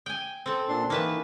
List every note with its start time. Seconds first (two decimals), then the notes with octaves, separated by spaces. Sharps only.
0.06 G5 G#5
0.46 C4 A4
0.69 A#2 D4 C6
0.90 D#3 E3 A#3 B4 A5